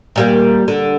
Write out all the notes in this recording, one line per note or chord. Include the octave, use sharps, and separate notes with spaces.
A#2 G3 A#3
D3